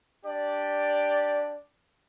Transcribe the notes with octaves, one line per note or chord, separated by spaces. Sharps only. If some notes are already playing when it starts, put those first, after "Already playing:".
D4 G4 D5